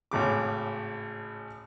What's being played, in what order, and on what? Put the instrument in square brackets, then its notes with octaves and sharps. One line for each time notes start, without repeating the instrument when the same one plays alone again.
[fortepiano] G#1 A2 C#3 D6